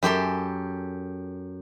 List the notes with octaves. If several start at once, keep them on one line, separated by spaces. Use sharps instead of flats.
F#2 G4 A4 C6